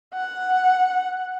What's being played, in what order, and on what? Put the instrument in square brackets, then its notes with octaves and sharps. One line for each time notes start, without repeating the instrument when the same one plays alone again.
[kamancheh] F#5